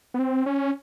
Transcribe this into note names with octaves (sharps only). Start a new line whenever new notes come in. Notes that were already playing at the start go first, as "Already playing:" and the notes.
B3
C4
C#4